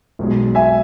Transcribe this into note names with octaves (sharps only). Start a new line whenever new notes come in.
B1 B2 G#3
E5 G#5